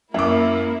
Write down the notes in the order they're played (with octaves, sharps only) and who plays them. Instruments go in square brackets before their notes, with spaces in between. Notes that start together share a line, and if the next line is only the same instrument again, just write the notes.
[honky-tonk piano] F#2 [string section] A#3 E4 [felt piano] E5 D6